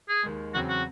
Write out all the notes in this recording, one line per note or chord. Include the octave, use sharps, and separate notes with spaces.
G#4
D#2 D#3 G#3
E2 C#3 F#3 C4 F#4
F#4